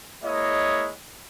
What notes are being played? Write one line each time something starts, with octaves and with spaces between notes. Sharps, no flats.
G#3 A#3 E4 C#5 D#5